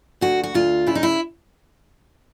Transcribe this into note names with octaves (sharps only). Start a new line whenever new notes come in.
D2 F#4
F#4
D2 F4
C#3 E4
D#4
E4